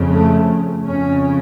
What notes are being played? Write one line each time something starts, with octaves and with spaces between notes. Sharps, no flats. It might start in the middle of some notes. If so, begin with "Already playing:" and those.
Already playing: F2 C#3
A3
F2 C#3 C#4